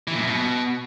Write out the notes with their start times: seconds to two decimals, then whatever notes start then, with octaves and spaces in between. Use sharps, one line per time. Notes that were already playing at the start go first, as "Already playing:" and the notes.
0.08 E3
0.14 A#2
0.20 F#2
0.27 B2